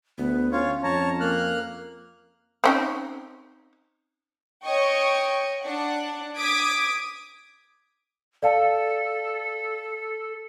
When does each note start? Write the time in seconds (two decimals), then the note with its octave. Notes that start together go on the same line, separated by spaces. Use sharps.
0.18 D2 B3
0.52 C#4 F4 C#5
0.83 F2 C#5 A5 A#5
1.20 A#3 F6 F#6
2.64 C4 C#4 D#4
4.64 C#5 D#5 G5 C#6
5.62 D4 F#5
6.37 D6 D#6 G#6 B6 D7
8.43 A4 D5 F5 A5